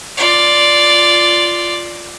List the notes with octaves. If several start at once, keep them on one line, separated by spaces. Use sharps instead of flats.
F4 D5